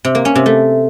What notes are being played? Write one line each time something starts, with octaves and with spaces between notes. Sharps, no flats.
C3
A#3
C#4
C3
A3